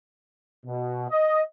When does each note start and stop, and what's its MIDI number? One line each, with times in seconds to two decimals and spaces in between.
0.66 1.07 47
1.10 1.40 75